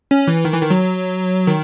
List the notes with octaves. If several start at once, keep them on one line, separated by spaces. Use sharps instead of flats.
C#4
E3
D#3
E3
D#3
F#3
D#3